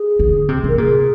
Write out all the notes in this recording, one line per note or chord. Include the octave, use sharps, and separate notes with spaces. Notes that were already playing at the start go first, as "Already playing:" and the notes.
Already playing: G#4
D3
C3
C3 A#4
A#2 G#4